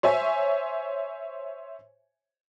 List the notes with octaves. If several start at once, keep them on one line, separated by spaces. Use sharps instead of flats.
C5 C#5 E5 G#5